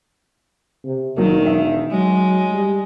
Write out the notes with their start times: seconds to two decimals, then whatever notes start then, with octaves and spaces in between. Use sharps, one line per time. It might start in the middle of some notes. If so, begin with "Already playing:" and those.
0.84 C3
1.17 E1 D#3 F#3 A#3
1.46 E5
1.91 F#3 G#3
2.52 G3